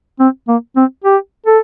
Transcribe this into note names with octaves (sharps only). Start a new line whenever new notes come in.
C4
A#3
C4
G4
A4